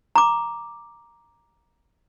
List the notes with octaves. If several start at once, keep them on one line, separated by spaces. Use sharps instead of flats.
A#5 D6